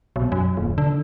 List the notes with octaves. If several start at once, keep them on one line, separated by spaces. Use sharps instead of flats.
B1
F#2
D#1
D3